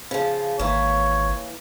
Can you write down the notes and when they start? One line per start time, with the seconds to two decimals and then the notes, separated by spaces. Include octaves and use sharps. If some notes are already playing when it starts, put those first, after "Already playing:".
0.11 C#3 F3
0.59 G#1 E3 A#3 C#5